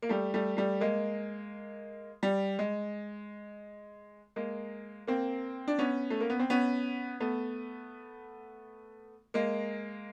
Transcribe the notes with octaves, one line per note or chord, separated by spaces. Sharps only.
A#3
G3 A3
G3 A3
G3 A3
G#3 A#3
G3
G#3
G#3 A#3
A#3 C4
D4
B3 C#4
A3
A#3
B3
C4
B3 C#4
A3 B3
G#3 A#3